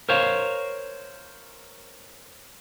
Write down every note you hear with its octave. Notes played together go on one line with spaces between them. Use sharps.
A#4 C5 C#5 F5